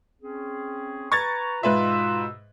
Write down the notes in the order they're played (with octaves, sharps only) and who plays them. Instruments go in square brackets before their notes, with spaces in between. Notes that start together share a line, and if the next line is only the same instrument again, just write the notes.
[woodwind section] C4 C#4 G#4
[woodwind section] B4 A#5 [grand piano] C#6 G#6 A6
[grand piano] G#2 B4 E5 [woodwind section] B2 E6 [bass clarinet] F4